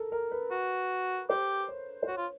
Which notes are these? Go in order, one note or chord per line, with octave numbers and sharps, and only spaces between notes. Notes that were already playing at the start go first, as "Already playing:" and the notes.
Already playing: A4 A#4
A#4
B4
F#4
G4 C5
C#5
C5
F#4 C#5
F4